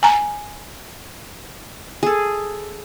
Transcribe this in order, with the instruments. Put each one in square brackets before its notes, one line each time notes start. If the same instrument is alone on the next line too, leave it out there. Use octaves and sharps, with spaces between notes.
[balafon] G#5 A#5
[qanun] G#4 A4